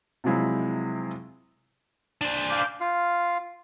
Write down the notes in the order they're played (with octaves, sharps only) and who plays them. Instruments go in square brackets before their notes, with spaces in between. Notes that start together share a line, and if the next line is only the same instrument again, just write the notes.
[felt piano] C3 F3 F#3 G#3 E4 F4
[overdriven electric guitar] D4 C5
[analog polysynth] F5 D6 G6
[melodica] F4 F5